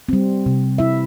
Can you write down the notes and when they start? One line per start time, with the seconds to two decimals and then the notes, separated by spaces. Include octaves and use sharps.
0.09 G3 C4
0.46 C3
0.78 E4 E5